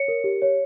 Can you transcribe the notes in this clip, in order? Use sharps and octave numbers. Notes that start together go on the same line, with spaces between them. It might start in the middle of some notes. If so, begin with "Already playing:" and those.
Already playing: C#5 C#7
A#4
G4
C#5